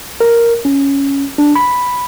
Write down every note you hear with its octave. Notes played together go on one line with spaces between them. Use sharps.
A#4
C#4
D4
B5